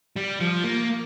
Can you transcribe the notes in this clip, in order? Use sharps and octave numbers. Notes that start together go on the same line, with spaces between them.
G3
F3
A#3